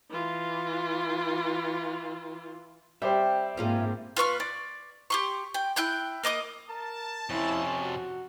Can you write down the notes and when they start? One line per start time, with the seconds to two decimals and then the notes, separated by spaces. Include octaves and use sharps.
0.10 E3 F4
3.02 G3 C4 G4 C5 E5
3.57 G#2 A#3 C4 C#4 F4 G#4
4.17 F4 B4 C#6 F6
4.40 D5
5.10 G4 C6 C#6
5.54 G5
5.76 E4 G5 F#6 G6
6.23 A#3 D#5 D6 D#6
6.69 A#4 A5
7.30 F2 C3 C#4 E4
7.80 F#4